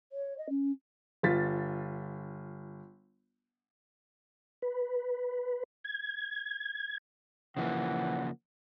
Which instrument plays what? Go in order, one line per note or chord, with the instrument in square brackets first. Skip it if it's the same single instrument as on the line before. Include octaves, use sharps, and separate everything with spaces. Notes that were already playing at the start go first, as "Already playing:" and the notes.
[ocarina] C#5
D#5
C#4
[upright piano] G1 F4 A6 B6
[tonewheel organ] B4
G#6
[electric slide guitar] C#3 F3 A#3 [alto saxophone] E3 [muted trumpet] F#5